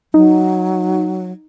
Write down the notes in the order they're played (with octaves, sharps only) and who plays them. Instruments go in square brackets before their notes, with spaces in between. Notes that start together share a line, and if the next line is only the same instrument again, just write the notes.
[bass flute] F#3 [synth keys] D#4